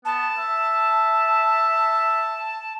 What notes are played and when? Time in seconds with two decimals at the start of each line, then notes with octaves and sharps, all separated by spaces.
0.05 B3 A5
0.37 E5